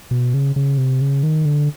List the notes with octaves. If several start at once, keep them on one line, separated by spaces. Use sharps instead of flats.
B2
C#3
C#3
C3
C#3
D#3
D3